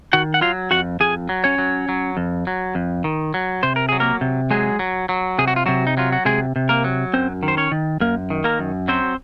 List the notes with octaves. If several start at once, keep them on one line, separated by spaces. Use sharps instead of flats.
D#3 F#4 F#5
F#5
F#3 F4 F5
F2 F#4 F#5
F2 G#4 G#5
F#3
C#4 C#5
F#3
F#3
F2
F#3
F2
D#3
F#3
C3 C5
A#4
F#3 G#4
A#3 A#4
C3
F#3 G#3 G#4
F#3
F#3
C3 G#4
F#4
F4
C3 F#3 F#4
D#4
F#3 F4
F#4
C3 G#3 G#4
C3
A#3 A#4
F#3
F#2 C4 C5
D#3
C5
C#4 C#5
D#3
F#2 A#3 A#4
D#3
A#3 A#4
F#2
F#3 C4 C5